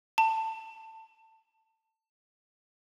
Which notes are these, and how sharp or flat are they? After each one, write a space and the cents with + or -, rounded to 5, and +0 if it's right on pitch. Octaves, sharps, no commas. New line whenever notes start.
A5 +20